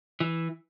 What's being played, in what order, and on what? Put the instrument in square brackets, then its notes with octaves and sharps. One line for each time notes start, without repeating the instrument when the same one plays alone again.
[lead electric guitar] E3